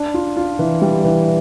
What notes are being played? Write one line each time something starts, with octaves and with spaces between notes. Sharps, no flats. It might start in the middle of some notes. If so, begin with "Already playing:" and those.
Already playing: D4
F4
F4
E3
G3
E3